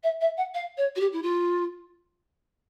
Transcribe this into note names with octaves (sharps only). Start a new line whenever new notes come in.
E5
E5
F#5
F5
C#5
F#4
G4
E4
F4